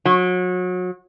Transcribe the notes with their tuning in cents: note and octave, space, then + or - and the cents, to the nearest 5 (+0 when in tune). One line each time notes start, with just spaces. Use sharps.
F#3 -30